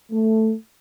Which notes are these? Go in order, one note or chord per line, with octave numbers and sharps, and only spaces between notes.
A3